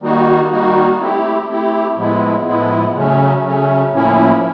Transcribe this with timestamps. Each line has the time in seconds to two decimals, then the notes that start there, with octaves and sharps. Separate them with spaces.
0.02 D#3 G3 A#3 D#4 F#4
0.51 D#3 G3 A#3 D#4 F#4
1.00 A3 C4 E4 G4
1.48 A3 C4 E4 G4
1.97 A2 F3 G#3 B3 E4
2.46 A2 F3 G#3 B3 E4
2.95 C#3 F#3 A3 C#4
3.44 C#3 F#3 A3 C#4
3.93 A2 F3 A#3 C#4 E4